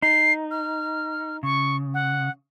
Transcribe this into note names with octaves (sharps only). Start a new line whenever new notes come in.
D#4 C7
F6
C#3 C#6
F#5